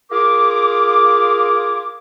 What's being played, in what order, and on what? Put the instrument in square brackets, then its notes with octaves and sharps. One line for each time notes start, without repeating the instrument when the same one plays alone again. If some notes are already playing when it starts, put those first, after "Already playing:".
[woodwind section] F4 G#4 A#4 D6